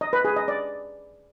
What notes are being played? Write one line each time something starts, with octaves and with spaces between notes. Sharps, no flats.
D#5
B4
G#4
D#5
D5